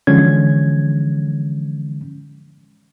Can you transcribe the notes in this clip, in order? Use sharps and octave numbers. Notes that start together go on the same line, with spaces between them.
D3 E3 F3 G#3 C#4 G#6